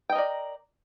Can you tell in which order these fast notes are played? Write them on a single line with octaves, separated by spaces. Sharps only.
G5 D#5 A#4 D5